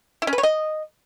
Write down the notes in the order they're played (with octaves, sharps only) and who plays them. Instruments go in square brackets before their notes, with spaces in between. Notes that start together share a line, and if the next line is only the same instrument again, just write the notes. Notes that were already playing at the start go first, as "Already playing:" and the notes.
[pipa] E4
C#4
B4
C#5
D#5